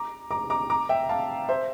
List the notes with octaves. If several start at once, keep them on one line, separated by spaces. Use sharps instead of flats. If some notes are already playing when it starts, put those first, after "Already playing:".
Already playing: A#5 D6
A#5 D6
A#5 D6
A#5 D6
E5 G5
F5 A5
C5 E5